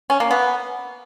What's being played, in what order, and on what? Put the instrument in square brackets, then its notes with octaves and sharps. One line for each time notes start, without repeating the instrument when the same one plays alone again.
[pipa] C#4
A#3
B3